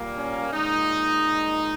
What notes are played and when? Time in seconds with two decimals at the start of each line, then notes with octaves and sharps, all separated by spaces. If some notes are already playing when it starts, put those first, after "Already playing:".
Already playing: A#2 G3 A#3
0.17 C#4
0.52 A#2 G#3 D#4